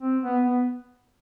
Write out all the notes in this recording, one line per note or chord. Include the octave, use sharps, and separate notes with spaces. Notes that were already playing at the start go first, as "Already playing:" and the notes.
C4
B3
B3